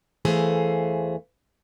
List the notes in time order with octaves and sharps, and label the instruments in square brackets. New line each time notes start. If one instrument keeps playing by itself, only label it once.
[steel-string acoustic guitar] E2 E3 A3 G#4 C5 F5